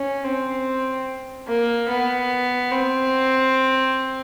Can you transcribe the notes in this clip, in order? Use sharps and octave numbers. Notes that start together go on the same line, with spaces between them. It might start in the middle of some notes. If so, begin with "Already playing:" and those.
Already playing: C#4
C4
A#3
B3
C4